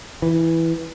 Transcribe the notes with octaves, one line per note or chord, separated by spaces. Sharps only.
E3